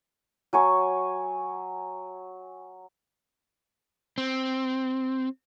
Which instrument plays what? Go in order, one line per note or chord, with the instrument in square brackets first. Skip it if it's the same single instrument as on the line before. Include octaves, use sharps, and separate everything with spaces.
[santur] F#3 G#5 C#6
[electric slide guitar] C4